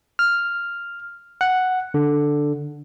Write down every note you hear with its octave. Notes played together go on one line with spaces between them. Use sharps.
F6
F#5
D3